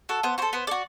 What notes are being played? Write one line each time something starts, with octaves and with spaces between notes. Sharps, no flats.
F#4 A4
B3 C5
F#4 A4 C5
B3 C5
F#4 A4 D5